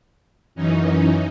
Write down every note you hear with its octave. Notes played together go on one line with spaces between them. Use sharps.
F#2 E3 C#4 D#4